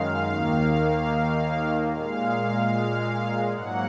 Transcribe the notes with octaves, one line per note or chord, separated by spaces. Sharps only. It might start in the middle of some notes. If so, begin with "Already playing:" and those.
Already playing: F#2 D#3 G#3 F5
D#2 D#3 A#3
A#2 G#3 F5
G#2 F#3 A#3 F#5